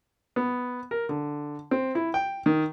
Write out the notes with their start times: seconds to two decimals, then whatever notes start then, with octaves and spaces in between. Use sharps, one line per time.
0.36 B3
0.91 A#4
1.09 D3
1.71 C4
1.95 E4
2.14 G5
2.46 D#3